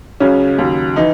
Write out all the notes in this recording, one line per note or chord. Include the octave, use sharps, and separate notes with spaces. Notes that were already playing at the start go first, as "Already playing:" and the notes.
C#2 C#3 F#3 C#4
D#2 C#3 F#3
E3 D#4